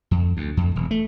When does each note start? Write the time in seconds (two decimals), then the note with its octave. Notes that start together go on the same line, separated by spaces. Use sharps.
0.11 F2
0.37 D2
0.57 F2
0.76 E1
0.91 A3